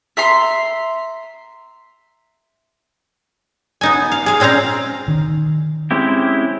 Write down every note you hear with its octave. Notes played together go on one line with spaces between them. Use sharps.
E5 A#5 C6
B3 D#4 G#5
F5
G#4 F5
A#2 C4 C#4 F5 A#5
D#3
G#3 C4 C#4 E4 G4